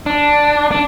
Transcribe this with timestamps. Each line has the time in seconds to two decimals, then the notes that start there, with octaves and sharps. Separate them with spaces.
0.06 D4
0.71 D4